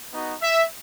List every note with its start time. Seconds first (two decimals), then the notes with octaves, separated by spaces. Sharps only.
0.11 B3 D#4 F#4
0.42 E5